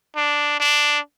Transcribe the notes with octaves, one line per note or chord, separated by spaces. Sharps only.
D4
D4